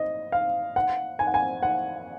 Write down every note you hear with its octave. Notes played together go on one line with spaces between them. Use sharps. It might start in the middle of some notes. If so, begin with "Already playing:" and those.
Already playing: D#5
F5
F#5
G#5
F#5
G#5
F#5